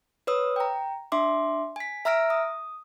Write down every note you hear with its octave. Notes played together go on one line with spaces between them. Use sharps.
B4 C#5 D#6 E6
G5 A#5
D4 E5 C6 D6
G#5 B6
E5 A#5 E6 F6 A#6 D7
D#6